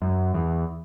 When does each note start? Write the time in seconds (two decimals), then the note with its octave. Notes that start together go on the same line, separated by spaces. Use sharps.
0.02 F#2
0.34 E2